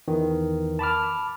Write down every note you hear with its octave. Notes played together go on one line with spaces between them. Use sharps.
E2 D#3 E3
A5 B5 D6 F6